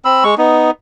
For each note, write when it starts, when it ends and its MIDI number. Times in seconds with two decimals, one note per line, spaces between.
0.05 0.24 60
0.05 0.24 83
0.05 0.24 88
0.24 0.35 56
0.24 0.35 85
0.38 0.71 59
0.38 0.71 63